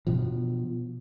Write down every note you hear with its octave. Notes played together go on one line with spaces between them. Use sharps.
B2 F3